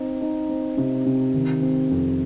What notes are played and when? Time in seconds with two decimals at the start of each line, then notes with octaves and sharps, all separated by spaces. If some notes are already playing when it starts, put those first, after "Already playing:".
Already playing: C4 D#4
0.21 D#4
0.49 C4
0.77 C3
1.06 C3
1.34 D#3
1.62 C4
1.90 F2